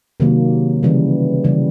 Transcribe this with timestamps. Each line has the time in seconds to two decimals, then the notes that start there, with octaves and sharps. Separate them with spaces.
0.20 C3 D#3 F#3 A#3
0.83 C#3 E3 G3
1.44 C#3 E3 G3